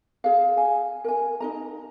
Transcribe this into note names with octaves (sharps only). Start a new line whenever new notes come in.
G#4 F5
G#5
A#4 G#5
D#4 A#4 A#5